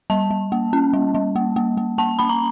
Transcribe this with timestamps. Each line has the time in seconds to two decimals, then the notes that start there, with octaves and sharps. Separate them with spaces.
0.10 G3 A5
0.31 G3
0.52 A#3
0.73 C#4
0.93 G3
1.15 G3
1.36 A#3
1.56 A#3
1.77 A#3
1.98 A#3 A5
2.19 A#3 B5
2.29 A#5